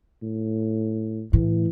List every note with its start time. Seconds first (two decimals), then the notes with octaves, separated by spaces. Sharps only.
0.22 A2
1.33 A2 E3